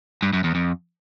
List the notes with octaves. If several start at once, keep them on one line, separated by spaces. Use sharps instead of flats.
G2
F#2
E2
F2